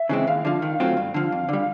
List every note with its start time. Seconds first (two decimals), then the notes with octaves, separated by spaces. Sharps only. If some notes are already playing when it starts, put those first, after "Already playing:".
Already playing: E5
0.09 C#3 E3 G#3 C4
0.27 D#2 F5
0.45 D3 F3
0.62 D#3
0.80 F#3 A3 C4 F4
0.97 G2
1.14 D3 F3
1.32 F2
1.49 D3 G3